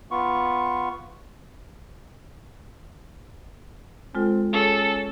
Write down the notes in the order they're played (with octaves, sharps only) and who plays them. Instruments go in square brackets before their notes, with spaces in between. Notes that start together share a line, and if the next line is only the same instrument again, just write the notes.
[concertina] B3 F4 C#6
[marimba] G#3 F4 A4 [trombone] C4
[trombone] C#4 [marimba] G#4 [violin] A4